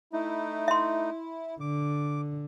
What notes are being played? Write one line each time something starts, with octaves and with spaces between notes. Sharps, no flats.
A3 D#4 E4
E5 C6
D3 D6